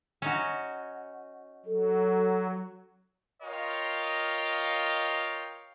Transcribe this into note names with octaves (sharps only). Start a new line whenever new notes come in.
C#4 D#4 F#4
F#3 A4
F4 A#4 C#5 D#5 F5 G5